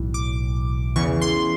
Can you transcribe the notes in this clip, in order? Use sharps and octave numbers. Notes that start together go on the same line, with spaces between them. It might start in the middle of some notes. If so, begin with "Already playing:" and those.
Already playing: B1 A2 E3
D6
E2 C#3 E3 C#6
C6